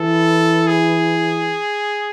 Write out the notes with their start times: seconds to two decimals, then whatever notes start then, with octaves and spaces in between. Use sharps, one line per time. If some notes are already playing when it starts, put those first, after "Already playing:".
Already playing: E3 A4
0.67 G#4